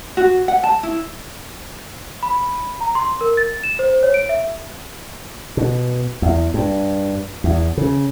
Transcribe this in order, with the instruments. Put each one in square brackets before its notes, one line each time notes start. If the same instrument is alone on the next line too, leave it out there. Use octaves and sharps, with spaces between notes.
[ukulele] F#4
F#5
A5
E4
[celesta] B5
A#5
C6
A#4
A6
E7
C5
C#5
D7
E5
[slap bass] B2
E2
G2
E2
C#3